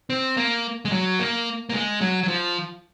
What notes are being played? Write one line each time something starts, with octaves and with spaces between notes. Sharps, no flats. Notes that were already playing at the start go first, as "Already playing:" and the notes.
C4
A#3
G#3
F#3
A#3
A#3
G#3
F#3
F#3
F3